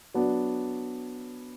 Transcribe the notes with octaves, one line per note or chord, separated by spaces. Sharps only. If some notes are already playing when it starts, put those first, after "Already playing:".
F#3 B3 D4 F#4